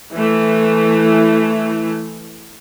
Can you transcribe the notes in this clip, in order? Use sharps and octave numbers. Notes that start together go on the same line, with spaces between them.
E3 A3